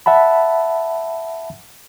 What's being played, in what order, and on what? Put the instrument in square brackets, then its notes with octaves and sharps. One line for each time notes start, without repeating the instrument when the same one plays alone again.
[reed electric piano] E5 F#5 A5 B5